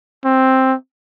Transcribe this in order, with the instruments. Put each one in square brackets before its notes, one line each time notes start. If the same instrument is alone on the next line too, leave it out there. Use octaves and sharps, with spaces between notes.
[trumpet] C4